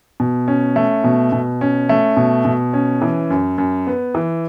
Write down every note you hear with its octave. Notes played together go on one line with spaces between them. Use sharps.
B2
C#4
A3
B2
B2
C#4
A3
B2
B2
C#4
E3
F#2
F#2
B3
E3